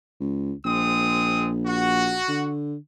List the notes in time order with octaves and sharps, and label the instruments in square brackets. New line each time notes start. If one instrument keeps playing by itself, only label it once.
[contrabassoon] C#2
[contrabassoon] A#1 [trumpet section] G#3 C4 D#6
[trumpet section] F#4
[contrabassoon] D3